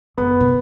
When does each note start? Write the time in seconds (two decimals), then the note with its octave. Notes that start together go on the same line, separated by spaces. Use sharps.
0.18 F#2 B3
0.40 B2